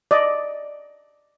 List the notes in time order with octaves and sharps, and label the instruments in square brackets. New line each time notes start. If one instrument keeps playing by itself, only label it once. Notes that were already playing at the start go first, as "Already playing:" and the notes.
[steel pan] D5 D#5